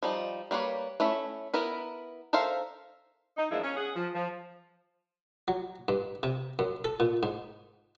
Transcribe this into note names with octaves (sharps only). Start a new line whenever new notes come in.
F3 G3 D#4
G3 A#3 B4 C#5
A3 C#4 E4 E5
B3 E4 A#4 B4
A4 A#4 C5 E5 F5
D#4
E2 F3 G#3 A#3 D4 E4
C#4
G#4 F#5
F3
F3
F#3
G2
C3
F#2
A4
A#2
G#2